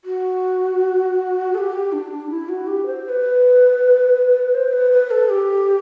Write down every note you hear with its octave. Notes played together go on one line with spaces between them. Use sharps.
F#4
A4
G4
D4
E4
F#4
G4
C5
C5
B4
C5
B4
B4
A4
G4